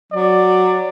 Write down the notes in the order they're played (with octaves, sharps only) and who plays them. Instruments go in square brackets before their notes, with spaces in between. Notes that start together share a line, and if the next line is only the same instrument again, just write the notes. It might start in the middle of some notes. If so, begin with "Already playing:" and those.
[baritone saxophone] F#3 [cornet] D5